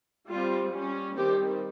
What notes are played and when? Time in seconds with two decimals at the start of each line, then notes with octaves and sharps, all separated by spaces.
0.28 G3 C4 F4
0.73 G3 C#4
1.16 D#3 G3 C4 G4